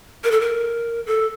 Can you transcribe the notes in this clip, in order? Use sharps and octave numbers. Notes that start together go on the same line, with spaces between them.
A#4
A4
A#4
A4